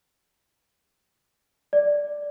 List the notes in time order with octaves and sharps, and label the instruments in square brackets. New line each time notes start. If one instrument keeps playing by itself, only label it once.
[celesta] D5